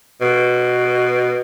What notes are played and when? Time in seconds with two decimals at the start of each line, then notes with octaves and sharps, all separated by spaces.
0.21 B2